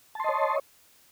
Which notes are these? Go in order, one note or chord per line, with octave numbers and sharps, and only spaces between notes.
C#5 D#5 A5 C6